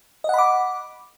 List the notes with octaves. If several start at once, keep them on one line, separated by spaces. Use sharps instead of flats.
D#5 F#5 B5 D6